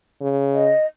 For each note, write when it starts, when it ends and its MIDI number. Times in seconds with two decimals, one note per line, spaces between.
0.21 0.72 49
0.53 0.86 75